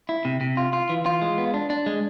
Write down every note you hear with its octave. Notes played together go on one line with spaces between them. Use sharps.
E4
C3
C3
F4
F4
E3
F4
G#3
B3
D4
D4
G#3